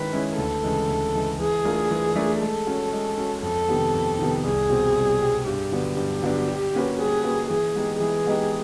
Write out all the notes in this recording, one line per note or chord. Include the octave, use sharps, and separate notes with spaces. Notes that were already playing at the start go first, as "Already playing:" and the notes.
Already playing: D#3 G#3 C#4 E4 B4
G#3 C#4 E4
D2 A4
C#3 E3 G#3
D2
C#3 E3 G#3
E3 G#4
A3 D4 F4 A#4
E3
A3 D4 F4 A#4
G#3 A4
C#4 F#4
G#3
C#4 F#4
F2 A4
C3 D#3 G3 B3
F2
C3 D#3 G3 B3
C2 G#4
B2 G3 C4
C2
B2 G3 C4
G2 G4
D3 F#3 B3 D4
G2 G4
D3 F#3 B3 D4
G3
A#3 C#4 F#4 B4
G3 G#4
A#3 C#4 F#4 B4
E3 G#4
G#3 B3 D#4 G4
E3 G#4
G#3 B3 D#4 G4